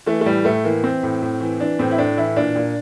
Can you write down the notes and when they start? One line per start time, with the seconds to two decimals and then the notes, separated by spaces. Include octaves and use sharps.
0.06 E3 A3
0.21 A3
0.26 A2 G3
0.45 A2 A3
0.64 E3 A#3
0.83 E3 C4
1.03 A2
1.22 A2
1.40 E3
1.60 E3 D4
1.79 A2 C4
1.91 E4
1.98 A2 D4
2.17 E3 E4
2.36 A#2 D4
2.56 A#2